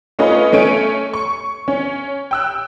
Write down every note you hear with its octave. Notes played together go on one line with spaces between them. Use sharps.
A3 C#4 F4 B4 D#5
A3 C#4 D7 D#7
C#6
C#4
G5 E6 F#6